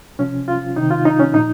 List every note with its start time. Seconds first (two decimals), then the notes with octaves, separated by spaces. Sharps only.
0.19 C3 F3 C#4
0.48 F4
0.76 C3 D#3 D#4
0.91 F4
1.05 D#4
1.20 C#4
1.34 A#2 F3 D#4